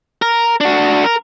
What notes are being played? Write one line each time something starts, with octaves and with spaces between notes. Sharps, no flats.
A#4
D4 F#4
A#4